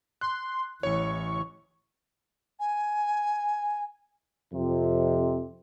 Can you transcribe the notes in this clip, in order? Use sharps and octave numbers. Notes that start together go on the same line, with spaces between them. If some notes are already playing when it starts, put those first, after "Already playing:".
C6 F#6
A1 E3 E4 C#5 C#6
G#5
F2 C3